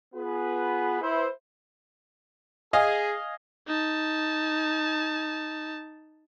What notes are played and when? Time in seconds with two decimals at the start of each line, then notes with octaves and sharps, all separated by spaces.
0.15 B3 F4 G#4 B4
1.02 E4 B4 C5
2.73 G#4 D#5 F5 G#5
3.67 D#4 A5